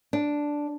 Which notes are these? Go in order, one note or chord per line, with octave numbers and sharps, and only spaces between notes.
D4